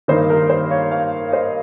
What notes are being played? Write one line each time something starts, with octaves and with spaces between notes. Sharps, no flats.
G2 D#3 A#3 D#4 C5
A#4
C5
C#5 F5
C#5 F5
C5 D#5